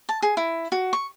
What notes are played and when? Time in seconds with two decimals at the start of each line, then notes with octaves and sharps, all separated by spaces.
0.09 A5
0.22 G#4
0.37 E4
0.72 F#4
0.93 C#6